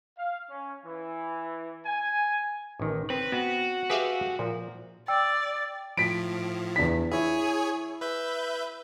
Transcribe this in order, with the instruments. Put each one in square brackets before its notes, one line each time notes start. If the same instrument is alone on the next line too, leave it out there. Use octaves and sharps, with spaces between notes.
[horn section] F5
C#4
E3
G#5
[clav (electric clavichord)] A1 D#3
[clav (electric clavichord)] C4 [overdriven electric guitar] B4
[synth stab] B3 [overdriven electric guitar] F#4
[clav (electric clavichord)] G4 G#4 G5 [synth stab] B4 E5 F5
[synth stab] A#2 [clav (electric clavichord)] F3
[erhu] D5 [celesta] G5 E6
[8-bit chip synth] A2 F3 [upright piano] B6 D7
[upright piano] E2 D4 B6
[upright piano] E4 [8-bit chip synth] G#4 C#5 G#5
[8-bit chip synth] B4 E5 G6